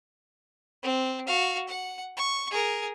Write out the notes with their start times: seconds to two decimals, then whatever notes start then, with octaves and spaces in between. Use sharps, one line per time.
0.83 C4
1.27 F#4 F5
1.68 F#5
2.17 C#6
2.51 G#4 A#4